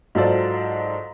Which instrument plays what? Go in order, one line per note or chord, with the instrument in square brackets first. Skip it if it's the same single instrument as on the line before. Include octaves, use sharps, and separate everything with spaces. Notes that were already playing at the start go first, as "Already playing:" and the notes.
[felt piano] G#2 F#3 F4 A4 C5 D5